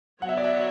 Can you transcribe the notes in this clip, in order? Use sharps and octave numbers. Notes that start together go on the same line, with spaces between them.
F#3 B3 F#4 C#5 F#5
E5
D5
E5